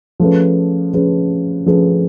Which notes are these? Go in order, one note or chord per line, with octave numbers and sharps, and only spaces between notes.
F3 A3 C#4 G#4 B4
F3 A3 C#4 G#4 B4
F3 A3 C#4 G#4 B4